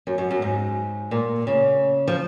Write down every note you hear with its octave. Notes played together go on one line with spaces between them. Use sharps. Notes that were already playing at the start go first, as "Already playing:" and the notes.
F#2
F#2
F#2
G#2
A#2
C#3
F3